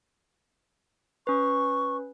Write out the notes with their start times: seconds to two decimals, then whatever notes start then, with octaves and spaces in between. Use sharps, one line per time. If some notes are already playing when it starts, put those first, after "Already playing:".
1.27 C#4 B4 C#6